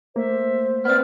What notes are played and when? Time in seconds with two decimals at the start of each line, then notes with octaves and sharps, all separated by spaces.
0.16 A3 A#3 C5 E5
0.85 B3 C4 D5 E5 F6